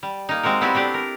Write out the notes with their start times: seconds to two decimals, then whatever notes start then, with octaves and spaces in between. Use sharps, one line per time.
0.03 G3
0.29 A#3 D#4
0.43 G#3 C4 F#4 A#4
0.61 G3 B3 C4 E4 F#4 G4
0.75 A3 D4 G4 D5
0.94 A#4